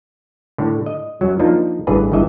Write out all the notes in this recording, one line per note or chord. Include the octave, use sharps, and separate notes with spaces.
A2 D3
D#5
F#2 F#3
F3 A#3 D4 D#4
A1 G2 D3 E3 G#4 B4
G#1 G2 E3 D#5 E5